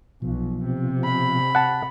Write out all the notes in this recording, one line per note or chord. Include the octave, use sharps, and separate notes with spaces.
B1 B2 F3
C3
B5
F#5 A5